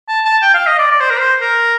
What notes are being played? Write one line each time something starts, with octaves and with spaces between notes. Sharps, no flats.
A5
A5
G5
F5
D#5
D5
D5
C5
A#4
C5
A#4